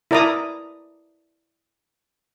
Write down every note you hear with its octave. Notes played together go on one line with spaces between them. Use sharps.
E4 A#4 D5 A#5 D6 D#6